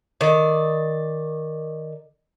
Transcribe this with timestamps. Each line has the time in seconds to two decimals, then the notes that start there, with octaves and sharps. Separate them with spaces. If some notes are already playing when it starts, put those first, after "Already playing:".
0.21 D#3 D5